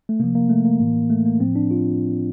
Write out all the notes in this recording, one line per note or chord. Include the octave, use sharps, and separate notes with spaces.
A3
C3 F3 A#3
A#3
A3
A#3
A2 E3
A3
A#3
A2 F3 C4
D4
F4